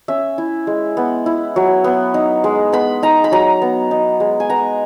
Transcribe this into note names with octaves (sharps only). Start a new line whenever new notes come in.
C#4 E5
E4
G#3
B3
E4
F#3
B3
D#4
G#3
B3 B5
D#4 A#5
B5
F#3 A#5
B3
D#4
G#3
G#5
B3 A#5